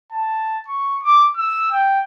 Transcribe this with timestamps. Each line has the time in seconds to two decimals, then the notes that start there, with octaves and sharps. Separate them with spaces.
0.12 A5
0.68 C#6
1.04 D6
1.37 E6
1.72 G5